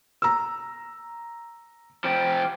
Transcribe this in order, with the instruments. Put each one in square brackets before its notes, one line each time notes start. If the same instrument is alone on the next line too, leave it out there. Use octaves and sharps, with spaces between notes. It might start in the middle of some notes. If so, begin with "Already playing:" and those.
[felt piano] A#5 E6
[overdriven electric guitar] F3 G4